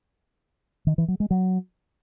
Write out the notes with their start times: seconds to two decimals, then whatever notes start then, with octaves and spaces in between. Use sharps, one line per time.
0.87 D#3
0.98 E3
1.08 F#3
1.20 G#3
1.31 F#3